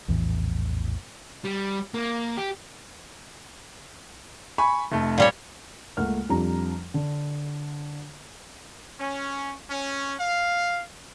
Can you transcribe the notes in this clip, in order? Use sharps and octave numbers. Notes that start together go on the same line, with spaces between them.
A#1 E2 A2 E3
G3
A#3
G4
G#5 B5 C#6
F1 A3
A#2 G3 C#5
C#2 A3 A#3 A#4 F#5 F6
F2 F3 G3 D4 A#5
D3
C#4
C#4
F5